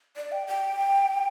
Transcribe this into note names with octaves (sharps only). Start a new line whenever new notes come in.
D5
G5
G5